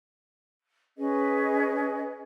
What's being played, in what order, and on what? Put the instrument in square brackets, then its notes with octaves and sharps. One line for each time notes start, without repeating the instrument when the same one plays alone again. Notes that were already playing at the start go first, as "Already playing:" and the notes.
[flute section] C#4 G#4 B4 D#5